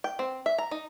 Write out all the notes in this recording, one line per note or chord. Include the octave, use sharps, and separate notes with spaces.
G5
C4
E5
A#5
D#4